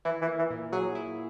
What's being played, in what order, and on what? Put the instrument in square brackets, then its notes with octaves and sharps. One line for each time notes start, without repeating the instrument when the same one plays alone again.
[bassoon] E3 [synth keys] E4
[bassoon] E3
[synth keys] A#3
[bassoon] E3
[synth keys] A#2
[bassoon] F#3 [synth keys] G#4
[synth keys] E4